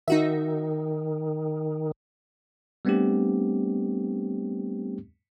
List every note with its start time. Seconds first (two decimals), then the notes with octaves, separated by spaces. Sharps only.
0.08 D#3 D#4 F#4 E5
2.85 G3 A3 B3 C4 D4 G4